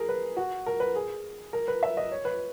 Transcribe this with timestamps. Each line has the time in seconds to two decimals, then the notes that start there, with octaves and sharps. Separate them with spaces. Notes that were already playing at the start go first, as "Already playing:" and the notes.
Already playing: G#4 A#4
0.09 B4
0.37 F#4
0.66 A#4
0.80 B4
0.96 G#4
1.53 A#4
1.68 B4
1.83 E5
1.97 D#5
2.12 C#5
2.25 B4